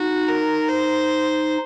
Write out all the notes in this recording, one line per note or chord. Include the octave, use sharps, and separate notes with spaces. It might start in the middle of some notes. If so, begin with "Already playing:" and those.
Already playing: D#4 F#4
A#4
C5